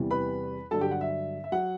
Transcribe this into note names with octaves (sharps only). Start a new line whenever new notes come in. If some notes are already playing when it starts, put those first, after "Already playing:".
Already playing: E2 C3 E3 G3
B4 B5
G2 D3 F#3 A4 A5
G4 G5
F#5
E5
E5
F#3 F#5